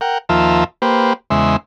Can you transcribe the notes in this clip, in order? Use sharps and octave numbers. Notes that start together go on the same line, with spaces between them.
A#4 F#5 G5
D#2 F3 F4 A#4 E5 A5
A#3 G4 B4 C5
E2 C#3 G#3 E5 C6